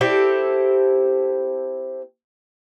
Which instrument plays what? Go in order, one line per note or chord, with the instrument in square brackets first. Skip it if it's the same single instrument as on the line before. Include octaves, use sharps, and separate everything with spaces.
[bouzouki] C4 E4 G4 A4